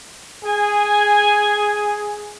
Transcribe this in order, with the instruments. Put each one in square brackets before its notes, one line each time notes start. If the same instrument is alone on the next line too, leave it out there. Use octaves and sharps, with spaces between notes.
[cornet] G#4 [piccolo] G#5